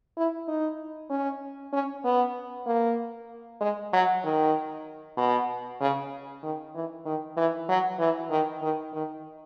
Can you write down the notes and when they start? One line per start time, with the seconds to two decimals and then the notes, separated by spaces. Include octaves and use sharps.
0.17 E4
0.48 D#4
1.10 C#4
1.73 C#4
2.05 B3
2.67 A#3
3.61 G#3
3.93 F#3
4.24 D#3
5.17 B2
5.81 C#3
6.43 D#3
6.75 E3
7.06 D#3
7.37 E3
7.69 F#3
7.99 E3
8.31 D#3
8.62 D#3
8.94 D#3